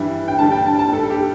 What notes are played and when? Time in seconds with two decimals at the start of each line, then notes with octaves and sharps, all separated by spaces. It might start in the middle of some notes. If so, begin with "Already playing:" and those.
Already playing: G2 E3 G3
0.28 G5
0.39 G2 D3 G3 A5
0.52 G5
0.66 A5
0.79 A5
0.92 G2 G3 A4
1.03 A4
1.10 G4